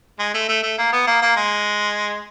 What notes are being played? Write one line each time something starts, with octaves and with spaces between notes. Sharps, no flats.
G#3
A3
A3
A3
A#3
B3
A#3
A#3
G#3